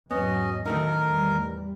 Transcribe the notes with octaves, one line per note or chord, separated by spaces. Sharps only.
E2 G#2 F#3 B3 C#4 D#5
A2 D#3 A3 D#4 A#4
E2 G3